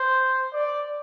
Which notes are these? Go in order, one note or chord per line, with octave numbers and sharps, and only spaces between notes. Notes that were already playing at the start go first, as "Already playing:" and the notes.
Already playing: C5
D5